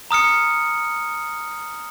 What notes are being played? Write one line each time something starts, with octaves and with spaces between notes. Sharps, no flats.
A#5 D#6 F6 C#7